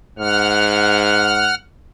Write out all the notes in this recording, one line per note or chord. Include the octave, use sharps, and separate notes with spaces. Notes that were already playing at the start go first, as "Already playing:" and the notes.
G#2 F#5 F6